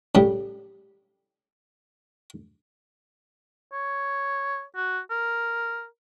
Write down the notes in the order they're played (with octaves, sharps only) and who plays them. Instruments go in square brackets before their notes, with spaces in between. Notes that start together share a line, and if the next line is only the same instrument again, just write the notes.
[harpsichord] A2 C#3 G3
[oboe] C#5
F#4
A#4